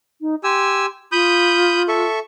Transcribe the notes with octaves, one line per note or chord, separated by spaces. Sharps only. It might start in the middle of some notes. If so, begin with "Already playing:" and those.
D#4
G4 G#5 C6 E6
F4 B5 D#6 G6
A4 E5 C#6